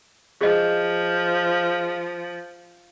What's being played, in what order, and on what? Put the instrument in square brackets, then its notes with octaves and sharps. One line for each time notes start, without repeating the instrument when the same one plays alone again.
[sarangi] F3 [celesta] G#4 D#5